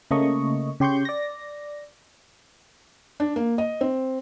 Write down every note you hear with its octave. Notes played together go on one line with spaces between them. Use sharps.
C#3 A3 A#3 D#5 C#6
C#3 G4 C6 C#6 G6
D5 A#6
D4
A#3
D#5
C4